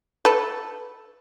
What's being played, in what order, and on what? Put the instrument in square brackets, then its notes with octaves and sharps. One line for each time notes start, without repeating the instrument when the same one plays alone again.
[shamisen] A4 B4